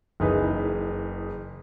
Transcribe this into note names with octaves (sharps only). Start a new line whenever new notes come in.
F#1 E3 D#4 G#4 B4